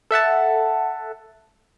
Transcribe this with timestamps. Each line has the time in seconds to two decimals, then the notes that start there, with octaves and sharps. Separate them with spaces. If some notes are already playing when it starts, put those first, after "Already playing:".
0.11 A4 E5 F#5 A5